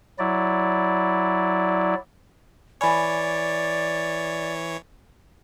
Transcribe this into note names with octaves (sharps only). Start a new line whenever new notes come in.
F#3 E4 D5
E3 C#5 D5 G#5 B5